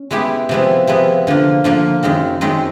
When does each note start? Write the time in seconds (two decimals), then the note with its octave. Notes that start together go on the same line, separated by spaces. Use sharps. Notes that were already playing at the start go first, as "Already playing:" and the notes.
Already playing: C#4
0.11 G#3 B3 E4 G4
0.49 C3 F3 G#3 B3 E4
0.87 C3 F3 G#3 B3 E4
1.27 D3 F3 A#3
1.64 D3 F3 A#3
2.03 F#2 D#3 G#3 C4
2.41 F#2 D#3 G#3 C4